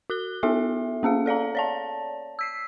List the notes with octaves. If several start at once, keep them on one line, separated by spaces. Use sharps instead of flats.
F#4 F#6 G7
B3 E4 F#4 A4 E5
A#3 C#4 G#4 F5
A4 D5 F5 A#5
C#5 D5 A5
E6 B6 C7